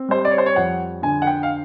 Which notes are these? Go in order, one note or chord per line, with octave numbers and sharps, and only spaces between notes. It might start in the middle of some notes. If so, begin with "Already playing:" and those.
Already playing: C4
G3 C5
D5
C#5
C5
C#5
F2 F#5
D3 G#5
F#5
G5
F5